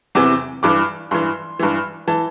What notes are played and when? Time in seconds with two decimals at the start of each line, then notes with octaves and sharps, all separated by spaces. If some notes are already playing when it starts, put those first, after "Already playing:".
0.15 E2 C3 E3 D6
0.63 G2 E3 D6
1.11 G2 E3 C6
1.59 G2 E3
2.08 E3 A5